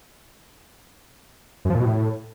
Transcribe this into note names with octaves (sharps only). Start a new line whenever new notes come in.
F#2
F3
A#2
B2
A2